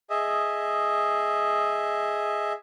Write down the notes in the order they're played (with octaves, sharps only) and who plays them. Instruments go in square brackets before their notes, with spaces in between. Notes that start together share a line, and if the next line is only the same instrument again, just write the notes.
[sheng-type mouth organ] G#4 D#5 E5